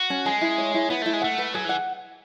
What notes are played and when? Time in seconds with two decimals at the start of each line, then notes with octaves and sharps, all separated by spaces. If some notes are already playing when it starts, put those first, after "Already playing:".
Already playing: F#4
0.10 C#4
0.25 G#3 G#4
0.41 E4
0.58 C#5
0.74 E4
0.90 B3 E4
1.02 A3 E4
1.13 G#3
1.22 A3 F#5
1.38 B4
1.54 F#3 G#4
1.65 E3 F#5